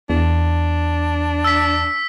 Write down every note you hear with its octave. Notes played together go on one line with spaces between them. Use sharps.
E2 D4
E6 B6